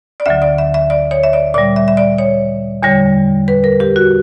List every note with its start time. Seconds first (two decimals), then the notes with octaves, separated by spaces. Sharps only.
0.20 D5
0.26 D2 D3 F#3 E5
0.42 D5
0.58 E5
0.74 E5
0.90 D5
1.11 C#5
1.23 E5
1.33 D5
1.54 A#2 G3 D5
1.76 E5
1.88 E5
1.97 D5
2.18 C#5
2.83 E2 D3 G3 C#5
3.48 B4
3.64 A#4
3.80 G4
3.96 F#4